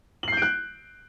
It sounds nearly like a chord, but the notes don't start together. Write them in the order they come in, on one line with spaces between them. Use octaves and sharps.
F#7 C7 G6 D7 F#6